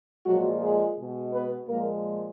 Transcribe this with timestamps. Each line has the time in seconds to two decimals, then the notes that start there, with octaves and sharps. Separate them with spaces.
0.25 A#2 F3 F#3 G#3 F#4
0.60 G#3 G#4
0.96 B2 G#3
1.33 B3 B4
1.68 A#2 F3 G#3 A#3 A#4